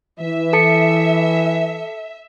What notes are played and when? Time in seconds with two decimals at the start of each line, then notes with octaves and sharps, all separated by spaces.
0.20 E3 E5
0.53 A4 A5 C#7